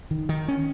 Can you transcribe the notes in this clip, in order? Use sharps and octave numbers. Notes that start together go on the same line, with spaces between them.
D#3
D#3
C#4